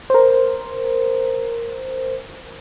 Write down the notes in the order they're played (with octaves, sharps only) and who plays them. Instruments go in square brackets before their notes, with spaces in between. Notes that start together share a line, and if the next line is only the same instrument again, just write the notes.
[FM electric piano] A#4 C5